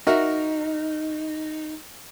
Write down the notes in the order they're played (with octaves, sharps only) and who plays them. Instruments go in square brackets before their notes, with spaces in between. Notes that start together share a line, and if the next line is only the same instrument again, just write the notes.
[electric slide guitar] D#4 [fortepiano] F#4 A#4 E5